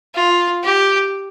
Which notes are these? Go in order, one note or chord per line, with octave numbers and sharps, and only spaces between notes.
F4
G4